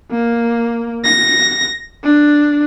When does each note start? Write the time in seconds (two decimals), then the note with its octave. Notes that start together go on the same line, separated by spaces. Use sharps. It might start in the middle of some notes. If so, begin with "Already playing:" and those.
0.11 A#3
1.04 A#6
2.04 D4